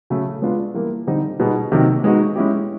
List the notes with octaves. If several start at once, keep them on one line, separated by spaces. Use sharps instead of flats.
C#3 F#3 A3
G#3 B3 D4 F4
E3 G3 A#3
D3 G3 C4 D#4
B2 G3 B3 D#4 G#4
C3 D#3 F#3 A#3 D#4
G#3 B3 D#4 F#4
G#3 C#4 E4 G4